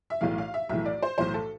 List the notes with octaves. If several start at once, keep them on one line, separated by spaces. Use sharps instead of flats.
E5
B1 A2 E3 F5
F5
E5
B1 A2 E3 E5
D5
C5
B1 A2 E3 C5
A4